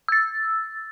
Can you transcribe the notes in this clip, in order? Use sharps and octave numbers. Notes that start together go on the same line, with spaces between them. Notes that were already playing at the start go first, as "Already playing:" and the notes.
E6 A6